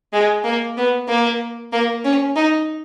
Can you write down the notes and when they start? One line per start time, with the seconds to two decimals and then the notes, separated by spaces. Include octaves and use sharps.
0.13 G#3
0.44 A#3
0.77 B3
1.08 A#3
1.72 A#3
2.04 C#4
2.36 D#4